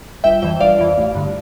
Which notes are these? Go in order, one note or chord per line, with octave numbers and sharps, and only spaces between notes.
G1 E5 G5
F2 E3 E5 G5
G1 D5 F5
F2 E3
A1
G2 D3